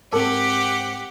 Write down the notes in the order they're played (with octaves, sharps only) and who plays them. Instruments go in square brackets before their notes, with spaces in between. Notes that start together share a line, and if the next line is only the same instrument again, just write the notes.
[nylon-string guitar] G#2 C4 [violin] G4 F#5 [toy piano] G#4 A#4 A5